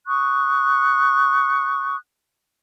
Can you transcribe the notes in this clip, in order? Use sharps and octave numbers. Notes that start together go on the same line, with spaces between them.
C#6 D#6 F#6